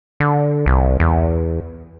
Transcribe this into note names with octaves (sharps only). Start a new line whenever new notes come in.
D3
C2
E2